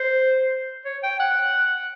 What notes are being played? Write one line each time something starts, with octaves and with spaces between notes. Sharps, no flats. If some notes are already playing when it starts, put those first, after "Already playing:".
Already playing: C5
C#5
G5
F#5